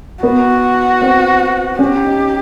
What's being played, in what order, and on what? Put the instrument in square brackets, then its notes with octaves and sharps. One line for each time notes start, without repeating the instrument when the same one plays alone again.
[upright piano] B3 [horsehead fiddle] F#4
[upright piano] C4
[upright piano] C#4 [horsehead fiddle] G4
[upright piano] D#4